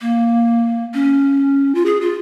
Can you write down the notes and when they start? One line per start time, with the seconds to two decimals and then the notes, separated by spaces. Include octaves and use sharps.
0.01 A#3
0.94 C#4
1.75 F4
1.86 G#4
2.01 F4